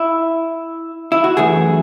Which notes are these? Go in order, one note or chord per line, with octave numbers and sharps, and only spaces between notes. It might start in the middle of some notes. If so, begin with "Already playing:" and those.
Already playing: E4
E4
F#4
F#2 E3 A3 G#4